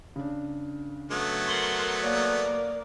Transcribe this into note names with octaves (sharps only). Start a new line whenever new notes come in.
C#3 D4
F#3 A3 B3
A#4 F#5 C6 C#6
A#3 C#5 D5 F5